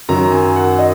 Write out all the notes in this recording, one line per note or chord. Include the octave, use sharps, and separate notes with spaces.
F#2 D#3 F#3 A#5
G#5
F#5
D#5